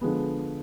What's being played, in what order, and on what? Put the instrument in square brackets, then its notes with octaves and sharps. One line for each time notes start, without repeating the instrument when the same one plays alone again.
[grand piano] D3 F3 G#3 B3